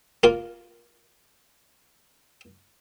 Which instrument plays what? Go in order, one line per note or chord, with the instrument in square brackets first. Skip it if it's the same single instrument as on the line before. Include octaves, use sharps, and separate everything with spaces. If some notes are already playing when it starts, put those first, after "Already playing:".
[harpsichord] A#3 F4